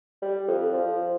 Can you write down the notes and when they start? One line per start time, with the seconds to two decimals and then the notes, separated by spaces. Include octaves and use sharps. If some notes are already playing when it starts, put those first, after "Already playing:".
0.22 G3
0.48 F2
0.73 F3